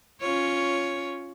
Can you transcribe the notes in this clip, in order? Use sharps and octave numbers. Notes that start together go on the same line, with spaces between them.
C#4 F4 C#5